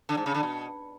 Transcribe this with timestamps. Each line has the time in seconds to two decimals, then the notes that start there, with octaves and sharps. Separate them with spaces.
0.09 D3
0.17 G#2
0.26 C#3
0.34 D3
0.43 B2